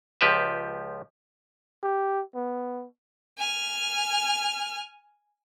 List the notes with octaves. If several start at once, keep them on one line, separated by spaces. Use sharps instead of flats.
C#2 F3 G4 B4 E5
G4
B3
G#5 F6